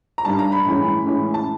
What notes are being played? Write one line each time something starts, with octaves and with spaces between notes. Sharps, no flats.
A#5
G2 D#3 G3 A5
A#5
B5
A2 E3 G#3 C#4
A2 E3 G#3 C#4
A5